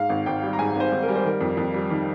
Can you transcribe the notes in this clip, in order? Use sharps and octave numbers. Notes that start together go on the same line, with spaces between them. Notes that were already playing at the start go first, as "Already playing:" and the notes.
Already playing: G#2 F5
G#1
G#1 G5
G3
A#5
G#2 G#5
G#1 C5
G#1
A#4
G3
C5
D#3 A#4
F2
F2
G3
D#3